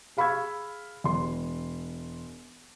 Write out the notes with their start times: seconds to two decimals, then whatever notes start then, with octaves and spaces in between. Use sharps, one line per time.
0.17 G#4 F5 B5 C#6 E6 G#6
1.04 E1 C6